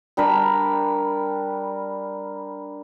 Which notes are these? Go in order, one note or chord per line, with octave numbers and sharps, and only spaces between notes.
G3 D4 A#4 B5